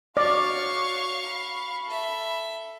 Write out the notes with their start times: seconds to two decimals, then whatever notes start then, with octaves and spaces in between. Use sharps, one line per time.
0.17 F#4 C#5 D5 F5 C#6
1.26 B5
1.86 A4 E5